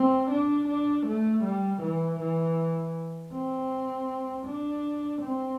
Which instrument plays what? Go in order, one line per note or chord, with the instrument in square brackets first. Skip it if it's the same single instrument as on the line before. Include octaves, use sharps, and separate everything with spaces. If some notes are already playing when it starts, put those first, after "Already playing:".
Already playing: [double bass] C4
D4
D4
A3
G3
E3
E3
C4
D4
C4